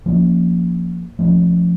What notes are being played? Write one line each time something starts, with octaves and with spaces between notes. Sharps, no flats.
F3 A#3 C#4
F3 A3 C#4